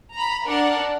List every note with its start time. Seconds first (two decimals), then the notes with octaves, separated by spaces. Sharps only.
0.14 A#5 B5
0.46 D4 A#4 F#5